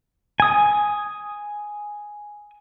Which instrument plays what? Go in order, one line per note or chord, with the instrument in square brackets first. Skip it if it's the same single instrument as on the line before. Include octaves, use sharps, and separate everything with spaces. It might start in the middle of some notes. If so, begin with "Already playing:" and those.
[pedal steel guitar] G#5 D#6